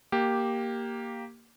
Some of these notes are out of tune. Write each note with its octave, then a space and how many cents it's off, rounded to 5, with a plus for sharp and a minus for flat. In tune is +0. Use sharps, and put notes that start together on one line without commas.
A#3 +0 G4 +0